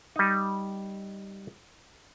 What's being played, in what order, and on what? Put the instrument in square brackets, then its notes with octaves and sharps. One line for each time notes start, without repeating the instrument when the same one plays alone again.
[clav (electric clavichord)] G3 D#4